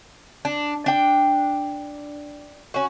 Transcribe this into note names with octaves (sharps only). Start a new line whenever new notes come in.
D4
D4 G5
C#4 F#4